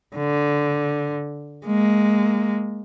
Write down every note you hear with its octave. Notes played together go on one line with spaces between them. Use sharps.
D3
G#3 A#3